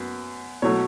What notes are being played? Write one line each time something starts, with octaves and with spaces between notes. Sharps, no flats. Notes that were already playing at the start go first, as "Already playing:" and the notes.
Already playing: F#2 B3
B2 F#3 A3 C#5